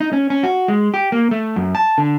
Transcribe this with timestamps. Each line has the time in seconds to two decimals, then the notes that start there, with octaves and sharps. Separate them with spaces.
0.01 D#4
0.13 C#4
0.30 C#4
0.43 F#4
0.68 G#3
0.94 G4
1.12 A#3
1.31 A3
1.56 F#2
1.75 A5
1.98 D3